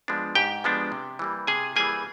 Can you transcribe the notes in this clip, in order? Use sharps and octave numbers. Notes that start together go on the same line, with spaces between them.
F3 G#3 B3 D4
G#2 G4 G5
F3 G#3 B3 D4
C3
E3 G3 A#3
C3 G#4 G#5
E3 G3 A#3 G#4 G#5